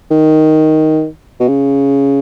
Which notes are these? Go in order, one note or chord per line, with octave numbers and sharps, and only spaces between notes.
D#3
B2
C#3